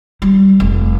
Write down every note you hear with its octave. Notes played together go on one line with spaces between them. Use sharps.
G3
F1